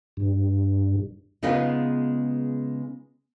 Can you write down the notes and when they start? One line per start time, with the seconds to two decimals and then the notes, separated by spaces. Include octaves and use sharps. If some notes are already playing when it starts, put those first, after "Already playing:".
0.17 G2
1.43 C#3 G#3 B3 D#4 F4 B4